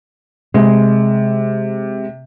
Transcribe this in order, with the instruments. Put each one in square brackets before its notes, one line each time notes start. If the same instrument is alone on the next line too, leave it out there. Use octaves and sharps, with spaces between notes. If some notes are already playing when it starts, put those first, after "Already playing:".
[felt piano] C3 [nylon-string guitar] G#3